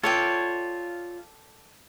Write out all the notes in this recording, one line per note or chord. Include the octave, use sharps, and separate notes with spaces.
F4 A4 C#5 D5 G5